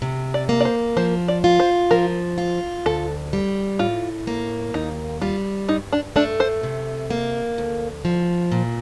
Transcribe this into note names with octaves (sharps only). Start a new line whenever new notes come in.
C3
D5
A#3
D5
C5
F3 C5
D5
F4
C5
F3 A#4
F4
D2 A4
G3
A2 F4
A#3
D#2 D#4
G3 F4
G2 D#4
D4
A3 D4
C5
C3
A#3
D2
F3
A#2